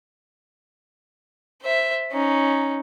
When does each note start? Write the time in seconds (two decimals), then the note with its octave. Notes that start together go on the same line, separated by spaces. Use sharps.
1.62 C5 E5
2.12 C#4 D#4